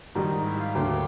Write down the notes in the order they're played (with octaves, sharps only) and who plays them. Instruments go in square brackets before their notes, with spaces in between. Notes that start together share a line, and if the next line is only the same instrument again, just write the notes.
[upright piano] G#2 D#3 G3 [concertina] D#4 D#5
[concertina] E4 E5
F4 F5
[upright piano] D2 D3 F#3 A#3 [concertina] G4 G5